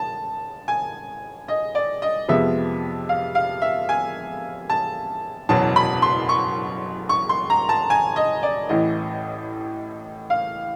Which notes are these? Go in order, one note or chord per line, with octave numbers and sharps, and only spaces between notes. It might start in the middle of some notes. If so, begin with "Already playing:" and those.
Already playing: A5
G#5
D#5
D5
D#5
F2 C3 F3 G#3 B3 E5
F5
F5
E5
G#5
A5
F#1 E2 B2 F#3 A5
B5
C6
C#6
C#6
C6
A#5
A5
G#5
D#5
D5
A1 A2 E3 D#5
F5